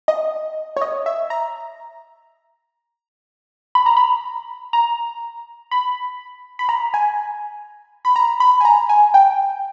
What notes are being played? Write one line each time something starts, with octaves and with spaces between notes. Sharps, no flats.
D#5
C#5
D#5
E5
A#5
B5
A#5
B5
A#5
B5
B5
A#5
G#5
B5
A#5
B5
G#5
A#5
G#5
G5